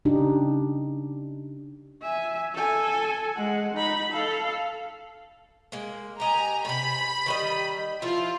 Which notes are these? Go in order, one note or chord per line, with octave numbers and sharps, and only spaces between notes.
C#3 D4 D#4 G4
E5 G#5
A4 G#5
G#3 F#5
D#4 B5
A4 F5
G#3 A#3
G4 D#5 G#5 A#5
A2 C3 B5
D#3 G3 D#5
F3 E4 F4